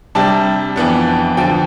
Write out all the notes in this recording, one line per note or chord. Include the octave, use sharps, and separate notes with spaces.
C3 G3 D4 A5
F2 E3 B3 D4
F2 D3 F3 G5